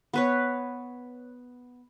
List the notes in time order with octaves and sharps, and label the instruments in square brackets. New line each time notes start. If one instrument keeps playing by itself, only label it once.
[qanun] B3 B4 C#5